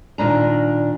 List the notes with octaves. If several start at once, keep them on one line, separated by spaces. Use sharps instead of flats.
D#2 A#2 D4 A#5